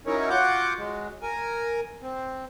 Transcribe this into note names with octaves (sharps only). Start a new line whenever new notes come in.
F#3 C#4 D#4 E4 A#4 C#5
F4 F#4 F#5 D6 G6
F#3 G#3
A#4 G#5
C4